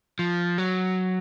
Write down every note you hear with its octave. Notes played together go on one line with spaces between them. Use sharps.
F3
F#3